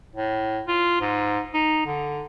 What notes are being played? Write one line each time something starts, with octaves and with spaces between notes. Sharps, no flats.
A2
F4
G#2
D#4
D3